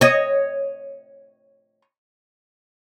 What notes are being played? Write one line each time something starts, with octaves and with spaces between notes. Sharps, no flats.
C#5 D#5